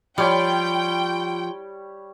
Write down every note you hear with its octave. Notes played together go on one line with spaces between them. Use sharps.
F3 G3 C#5 G5 B5